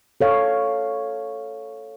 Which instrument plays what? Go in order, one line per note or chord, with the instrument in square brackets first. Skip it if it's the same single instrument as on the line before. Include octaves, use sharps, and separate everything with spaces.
[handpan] A4 C#5 F5